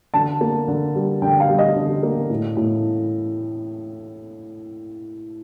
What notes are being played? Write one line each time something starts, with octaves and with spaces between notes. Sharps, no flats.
D3 A5
A#3
D3
G3
D3 G5
F5
G3
D#5
D3
A#3
A2
A2